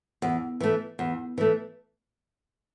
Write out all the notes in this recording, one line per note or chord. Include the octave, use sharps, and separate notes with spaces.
E2
E3 A3
E2
E3 A3